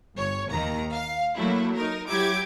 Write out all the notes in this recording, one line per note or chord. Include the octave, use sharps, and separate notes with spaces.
G1 C#5
D#2 D#3 A#5
F5
F#3 A3 A#3 E4
D#4 A#4
F#3 E4 G4 D6 G#6